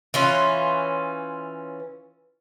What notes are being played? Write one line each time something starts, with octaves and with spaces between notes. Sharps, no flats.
E3 C#4 F4